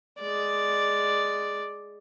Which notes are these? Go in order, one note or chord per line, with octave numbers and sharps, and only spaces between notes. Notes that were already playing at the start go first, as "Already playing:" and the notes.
G#3 D5